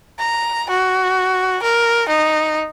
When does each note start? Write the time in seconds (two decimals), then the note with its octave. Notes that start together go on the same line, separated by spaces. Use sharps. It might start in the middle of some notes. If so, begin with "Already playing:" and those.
0.19 A#5
0.70 F#4
1.63 A#4
2.08 D#4